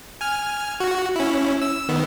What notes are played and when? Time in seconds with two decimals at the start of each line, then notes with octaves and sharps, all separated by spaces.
0.21 G#5 F6
0.80 F#4
1.16 C#4 E4
1.62 E6
1.88 D#3 B3